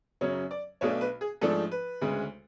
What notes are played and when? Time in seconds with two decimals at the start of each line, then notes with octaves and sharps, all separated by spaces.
0.21 F#2 C#3 F#3 C#4 C#5
0.51 D5
0.81 B1 B2 A3 D4 C#5
1.01 B4
1.21 G#4
1.41 G#2 F3 A3 D4 A4
1.71 B4
2.01 D2 C#3 G#3